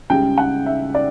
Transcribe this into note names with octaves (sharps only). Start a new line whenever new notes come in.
C#2 C#3 G3 G5
F#5
E5
D5